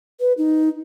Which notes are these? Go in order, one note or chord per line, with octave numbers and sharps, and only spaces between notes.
B4
D#4